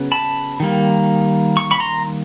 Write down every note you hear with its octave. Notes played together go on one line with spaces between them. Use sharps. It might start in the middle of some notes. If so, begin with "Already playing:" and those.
Already playing: C#3 F#3 B3
A5 B5
D#3 G3 A#3
C#6
B5 C#6
A#5 C6